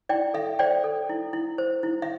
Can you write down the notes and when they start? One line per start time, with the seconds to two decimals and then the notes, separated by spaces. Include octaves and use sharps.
0.09 E4 D5 G5
0.34 A4 E5
0.59 C5 D5 G5
0.84 A4
1.09 E4
1.33 E4
1.58 C5
1.83 E4
2.02 E5